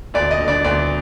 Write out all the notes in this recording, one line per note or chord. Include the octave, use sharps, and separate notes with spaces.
D2 D5
D#5
D3
D5
D2 D5